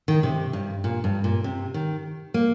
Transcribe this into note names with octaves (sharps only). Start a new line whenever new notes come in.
D#3
C3
G2
A#2
G2
A#2
C3
D#3
A#3